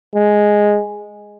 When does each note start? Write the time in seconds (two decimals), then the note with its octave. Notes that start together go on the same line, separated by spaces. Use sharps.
0.15 G#3